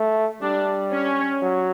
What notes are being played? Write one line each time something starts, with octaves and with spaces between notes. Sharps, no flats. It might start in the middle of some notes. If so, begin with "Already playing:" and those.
Already playing: A3
G3 D4
C#4
F#3